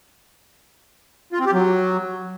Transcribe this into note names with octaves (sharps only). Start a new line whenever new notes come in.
F4
C4
G4
F#3